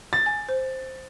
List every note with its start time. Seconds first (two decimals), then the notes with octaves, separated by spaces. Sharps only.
0.13 A6
0.26 G#5
0.49 C5